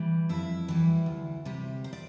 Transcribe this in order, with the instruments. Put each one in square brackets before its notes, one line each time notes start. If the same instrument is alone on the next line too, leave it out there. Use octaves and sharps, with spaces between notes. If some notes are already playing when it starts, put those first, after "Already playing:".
Already playing: [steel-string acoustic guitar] E3 G3
F2 E4 E5
E3 G3
D2
C3 G3
C5
D5